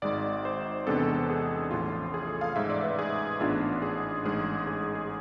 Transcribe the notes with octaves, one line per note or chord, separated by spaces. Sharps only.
G#1 G#2 G#3 D5
C5
E2 C3 G#3 B3 D4 A4
G#4
A1 A2 F3 F4
G#4
A4
F5
A1 G#2 G#3 E5
D5
B4
G#4
A1 G#2 G#3 B3 D4 F4
G#4
A1 G#2 G#3 G#4
G#4
G#4